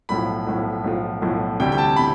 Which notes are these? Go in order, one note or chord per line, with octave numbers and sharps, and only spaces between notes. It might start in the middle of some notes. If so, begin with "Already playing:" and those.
B1 A2 F3 B5
B1 A2 F3
B1 A2 F3
B1 A2 F3
D2 C3 G3 G5
G5
A5
C3 B5